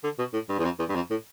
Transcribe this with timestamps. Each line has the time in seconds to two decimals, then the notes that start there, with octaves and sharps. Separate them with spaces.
0.04 D3
0.18 B2
0.33 A2
0.49 G2
0.59 E2
0.64 F2
0.79 E2
0.89 G2
0.95 F2
1.10 A2